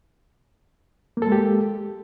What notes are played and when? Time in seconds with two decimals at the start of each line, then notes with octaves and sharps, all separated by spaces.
1.17 A#3
1.22 A4
1.27 G#3
1.32 G4